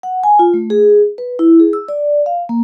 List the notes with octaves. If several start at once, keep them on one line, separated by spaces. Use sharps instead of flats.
F#5
G#5
F4
A3
G#4
B4
E4
G#4
E6
D5
F5
A#3